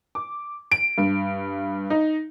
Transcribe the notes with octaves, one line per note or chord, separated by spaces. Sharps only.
D6
D7
G2
D#4